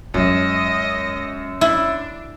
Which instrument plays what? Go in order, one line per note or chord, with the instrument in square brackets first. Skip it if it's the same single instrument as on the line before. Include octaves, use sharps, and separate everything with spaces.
[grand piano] F#2 [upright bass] F#3 G#3 [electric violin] D#5
[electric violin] D4 [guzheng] E4